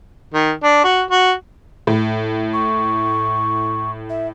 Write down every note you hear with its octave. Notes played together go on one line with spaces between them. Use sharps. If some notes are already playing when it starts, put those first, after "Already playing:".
D#3
D4
F#4
F#4
A2
C#6
E5